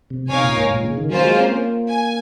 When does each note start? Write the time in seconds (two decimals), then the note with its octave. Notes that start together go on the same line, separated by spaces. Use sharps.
0.10 C3
0.30 C3 D#4 A#4 C#5 F5 G#5
0.44 A#2
0.57 G#2
0.71 A#2
0.83 C#3
0.97 D#3
1.10 F#3 A#3 C#4 F4 C5
1.24 G#3
1.37 C4
1.50 A#3
1.90 G#5